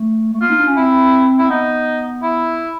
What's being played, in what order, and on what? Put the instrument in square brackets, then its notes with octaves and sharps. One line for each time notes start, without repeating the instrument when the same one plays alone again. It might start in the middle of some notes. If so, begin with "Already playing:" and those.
Already playing: [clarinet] A3
A3
[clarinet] A#3 [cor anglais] F4
[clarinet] D#4
D4
C#4
[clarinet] C4 [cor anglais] E4
[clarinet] C4 [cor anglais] E4
[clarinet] B3 [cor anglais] D#4
[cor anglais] E4